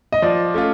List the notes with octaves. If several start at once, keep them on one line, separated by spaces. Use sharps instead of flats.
D#5
F3 D5
A3 C#4 F4